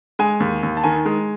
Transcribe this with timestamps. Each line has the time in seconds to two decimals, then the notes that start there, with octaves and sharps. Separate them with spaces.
0.19 G#3 G#5
0.40 D#2
0.63 D#2
0.77 A5
0.84 D#3 G#5
1.05 G#3